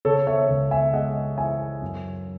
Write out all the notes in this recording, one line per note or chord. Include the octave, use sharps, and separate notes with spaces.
C#3 A4 C#5
C#5 E5
C#2
E5 G#5
G#3 D#5 F#5
E3 E5 G#5
F#2